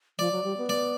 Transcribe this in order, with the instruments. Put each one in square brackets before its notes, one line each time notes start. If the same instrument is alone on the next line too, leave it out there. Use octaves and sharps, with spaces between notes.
[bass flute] F3 [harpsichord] D5
[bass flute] F#3
G3
B3
[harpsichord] D5